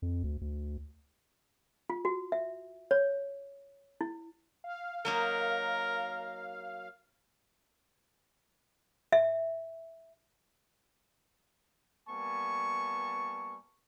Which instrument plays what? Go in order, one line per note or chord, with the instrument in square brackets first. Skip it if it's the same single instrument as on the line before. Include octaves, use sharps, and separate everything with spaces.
[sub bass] F2
D2
D2
[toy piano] F4
F#4
E5
C#5
E4
[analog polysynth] F5
[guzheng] F#3 A#3 D#4 [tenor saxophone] A#4
[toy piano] E5
[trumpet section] G3 A#3 B3 G#5 A5 C#6